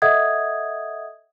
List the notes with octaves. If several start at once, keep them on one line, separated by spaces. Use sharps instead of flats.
A4 D#5 E5 F#5 D#6 G#6